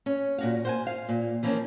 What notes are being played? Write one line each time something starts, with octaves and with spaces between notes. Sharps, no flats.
C#4
A#2 F#4 F5
C5 F#5 G#5
F5
A#2
E3 F3 A#3 C#4